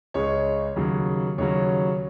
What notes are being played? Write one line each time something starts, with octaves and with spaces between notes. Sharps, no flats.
C#2 C#3 G#3 C#5
D#2 C#3 F#3
D#2 C#3 F#3 C#5